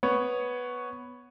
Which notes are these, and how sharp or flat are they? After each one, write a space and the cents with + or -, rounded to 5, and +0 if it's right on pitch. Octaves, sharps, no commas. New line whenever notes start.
B3 +0 C#5 +0